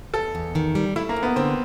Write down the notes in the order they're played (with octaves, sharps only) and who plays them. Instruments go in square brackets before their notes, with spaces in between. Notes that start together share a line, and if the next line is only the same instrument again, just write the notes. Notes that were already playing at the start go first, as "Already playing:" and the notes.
[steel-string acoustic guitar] E2 [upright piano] A4
[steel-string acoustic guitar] E2
D#3
G3
[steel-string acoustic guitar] A3 [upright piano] E4
[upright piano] A#3
[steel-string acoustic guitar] C#3
[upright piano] B3
[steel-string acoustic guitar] D3 [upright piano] C4